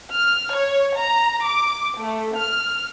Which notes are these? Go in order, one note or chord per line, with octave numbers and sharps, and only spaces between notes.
F6
C#5
A#5
D6
A3
F6